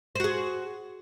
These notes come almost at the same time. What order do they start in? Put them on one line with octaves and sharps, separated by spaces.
C5 F#4 G#4